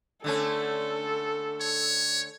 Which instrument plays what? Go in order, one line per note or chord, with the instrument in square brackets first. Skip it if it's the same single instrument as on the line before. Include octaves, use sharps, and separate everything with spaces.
[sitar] D3 A3 C#4 [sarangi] A4
[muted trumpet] C#5